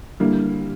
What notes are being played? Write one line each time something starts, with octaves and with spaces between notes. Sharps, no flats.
D3 G3 A#3 E4